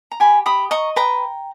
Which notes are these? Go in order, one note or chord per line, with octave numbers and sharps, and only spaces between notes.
A#5
G4 G#5 B5
G4 B5 D#6
D#5 A#5 C#6
B4 G5 A#5